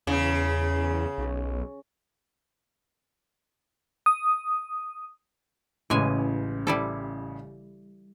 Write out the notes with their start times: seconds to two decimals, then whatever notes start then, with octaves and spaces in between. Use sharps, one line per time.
0.07 E2 C#3
1.18 B1
4.06 D#6
5.90 A1 C#3 E3 G#3 G#5
6.67 G3 E4 A4